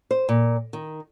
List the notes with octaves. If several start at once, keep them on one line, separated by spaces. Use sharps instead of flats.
C5
A#2
D#3